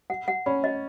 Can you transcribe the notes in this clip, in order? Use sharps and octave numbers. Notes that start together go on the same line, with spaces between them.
F#5
F#5
C#4 B5
D#5